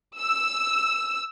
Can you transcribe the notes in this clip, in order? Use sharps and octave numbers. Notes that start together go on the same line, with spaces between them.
E6